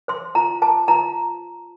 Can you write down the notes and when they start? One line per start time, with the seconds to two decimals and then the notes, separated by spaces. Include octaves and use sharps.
0.08 C5 C6
0.35 F4 A#5
0.62 C5 A5
0.88 F4 A#5